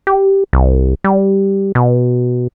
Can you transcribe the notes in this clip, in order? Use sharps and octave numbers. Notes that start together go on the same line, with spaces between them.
G4
C2
G3
B2